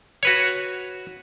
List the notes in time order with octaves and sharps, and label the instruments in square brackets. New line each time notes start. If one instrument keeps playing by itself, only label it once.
[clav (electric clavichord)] F#4 B4 C#5